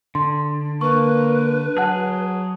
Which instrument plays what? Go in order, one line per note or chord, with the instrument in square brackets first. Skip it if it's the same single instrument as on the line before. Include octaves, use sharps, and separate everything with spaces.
[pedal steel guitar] D3 [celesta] C6
[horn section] A#3 [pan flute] B4 [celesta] C#6
[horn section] F#3 [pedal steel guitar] G#4 F#6 [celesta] F#5 A5